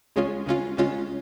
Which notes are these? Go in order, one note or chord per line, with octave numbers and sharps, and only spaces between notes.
C#2 C#3 G#3 C#4 F4
C#2 C#3 G#3 C#4 F4
C#2 C#3 G#3 C#4 F4